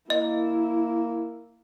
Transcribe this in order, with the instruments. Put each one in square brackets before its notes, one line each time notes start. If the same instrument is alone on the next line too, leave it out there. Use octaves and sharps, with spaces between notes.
[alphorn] A#3 [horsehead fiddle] E4 [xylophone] D#5